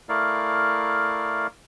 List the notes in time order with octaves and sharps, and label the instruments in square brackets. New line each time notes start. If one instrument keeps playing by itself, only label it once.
[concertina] A3 E4 A#4 D5 F5